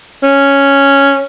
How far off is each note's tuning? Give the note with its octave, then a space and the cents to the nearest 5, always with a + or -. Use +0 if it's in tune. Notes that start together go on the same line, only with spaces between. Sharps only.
C#4 +0